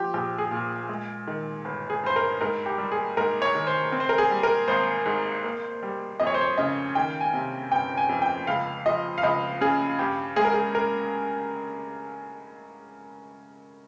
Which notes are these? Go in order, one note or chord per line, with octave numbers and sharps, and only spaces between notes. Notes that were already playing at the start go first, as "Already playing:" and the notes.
Already playing: F3 G4
A#1 G4
G#4
A#2
G#3
D#3
G1
G#4
G2 C5
A#4
G#2 A#4
G4
G3
G#4
G#2 A#4
C#5
D#3
C5
C4
C5
A#4
G#4
G3
A#4
G#1 C5
G#2
A#3
G3
F2 D#5
C#5
C5
C#5
C#3 D#5
D#3 G5
G#5
C3
G1 G5
G#5
F2
G5
C#2 F5
F3 D#5
F5
C#2 D#5
C#3 G#4
G2 G4
G#3 G#4
A#4
G#4
A#4